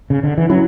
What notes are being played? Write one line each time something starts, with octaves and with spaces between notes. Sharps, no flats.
C#3
D3
E3
F#3 C#4 E4